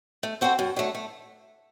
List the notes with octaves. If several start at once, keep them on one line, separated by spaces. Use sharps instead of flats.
A3
C4 F#4 A4 C5
F#2
D3 F#3 A3
A3